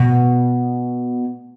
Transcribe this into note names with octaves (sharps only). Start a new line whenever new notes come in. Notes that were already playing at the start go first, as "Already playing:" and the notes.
Already playing: B2